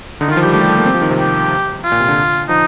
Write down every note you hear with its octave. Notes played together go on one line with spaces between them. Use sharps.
D3 D#4
D#3
F4
F3
G4
G3
A3 G4
G3
A3
A#3
C4
F3
D#3
C3
G4
F4
A#2
C3
D3
F3 D#4